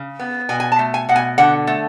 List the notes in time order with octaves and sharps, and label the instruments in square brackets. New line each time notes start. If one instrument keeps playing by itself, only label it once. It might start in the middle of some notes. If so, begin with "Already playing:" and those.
Already playing: [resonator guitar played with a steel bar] C#3
B3
B2 G#5
G#5
A5
A3
G#5
B2 F#5
G#5
D3 F#5
A3